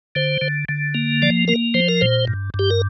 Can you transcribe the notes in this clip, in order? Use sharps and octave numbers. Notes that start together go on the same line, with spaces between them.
D3 C5
D3
D3
A#3
F3 D5
A#3 A#4
F3 C5
A#4
A#2 C5
G2
G2
G4
A#4